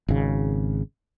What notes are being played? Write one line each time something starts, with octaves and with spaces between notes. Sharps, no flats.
G#1 C#3